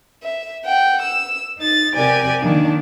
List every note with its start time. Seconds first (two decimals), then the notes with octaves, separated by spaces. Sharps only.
0.22 E5
0.65 F#5 G5
1.01 E6
1.57 D#4 A6
1.94 C3 G4 A#4 D5 G#5
2.41 D#3 A#3 D4